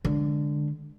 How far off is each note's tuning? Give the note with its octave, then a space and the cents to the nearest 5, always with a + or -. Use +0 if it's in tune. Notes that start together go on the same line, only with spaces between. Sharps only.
D3 +0 G#3 +0